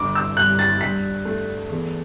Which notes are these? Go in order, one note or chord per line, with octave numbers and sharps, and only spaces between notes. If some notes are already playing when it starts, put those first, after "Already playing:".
Already playing: G1 D6
E6
G2 F#6
A6
G2 B6
A3
E2